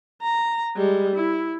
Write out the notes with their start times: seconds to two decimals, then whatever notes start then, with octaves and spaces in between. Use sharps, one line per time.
0.22 A#5
0.76 G3 G#3
1.16 E4